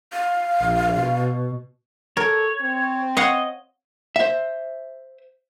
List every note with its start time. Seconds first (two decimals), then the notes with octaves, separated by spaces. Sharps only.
0.13 F5
0.61 A#1
0.94 B2
2.17 A4 A#4 C#5
2.61 C4
3.17 C#5 D#5 F5 F#5
4.16 C5 E5